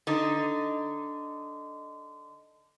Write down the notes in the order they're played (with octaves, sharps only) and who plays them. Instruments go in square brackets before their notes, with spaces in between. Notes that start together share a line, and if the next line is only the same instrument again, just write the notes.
[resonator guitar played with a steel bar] D3 D#4